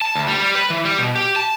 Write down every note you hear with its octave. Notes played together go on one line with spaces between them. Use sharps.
A5
D2
G3
G3
B4
E3
G3
B2
G4
A5